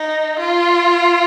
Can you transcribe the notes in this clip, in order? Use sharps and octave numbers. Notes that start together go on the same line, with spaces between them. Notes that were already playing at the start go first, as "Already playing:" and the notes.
Already playing: D#4
F4